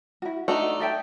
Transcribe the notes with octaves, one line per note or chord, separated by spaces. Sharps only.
E4 F#4
A3 D4 D#4 F#4 D#5
A4 E5 G5